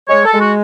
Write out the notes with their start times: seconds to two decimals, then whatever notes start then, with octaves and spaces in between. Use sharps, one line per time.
0.09 G#3 C#5
0.25 A4
0.33 G#3
0.41 F#4